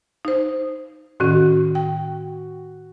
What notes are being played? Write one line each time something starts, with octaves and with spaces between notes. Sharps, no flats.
D#4 C5
A2 D#3 C#4 F#4
G5